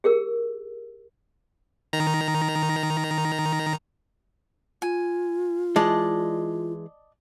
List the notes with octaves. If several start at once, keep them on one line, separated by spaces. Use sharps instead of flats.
G4 G#4 A#4 E6
D#3 A#5
F4 G#5
E3 G#3 D5 D#5 A5